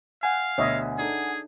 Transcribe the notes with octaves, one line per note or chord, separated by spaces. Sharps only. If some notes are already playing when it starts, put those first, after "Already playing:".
F5 F#5 G#5
D2 B2 C#5 D#5 E5
D4 D#4 G#4 A4